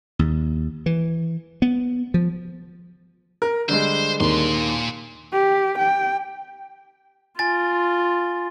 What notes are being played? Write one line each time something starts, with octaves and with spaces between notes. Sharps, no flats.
D#2
E3
B3
F3
A#4
D3 G3 G#3 C5
D#2 A#2 C6
G4
G5
F4 G#5 A6